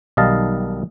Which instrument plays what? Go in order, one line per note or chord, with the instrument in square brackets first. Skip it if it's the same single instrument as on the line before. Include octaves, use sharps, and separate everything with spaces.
[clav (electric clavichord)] B1 D#3 G3 D#5 F5 A5